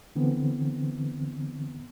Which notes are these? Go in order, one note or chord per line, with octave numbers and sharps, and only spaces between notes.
D3 E3 B3 C4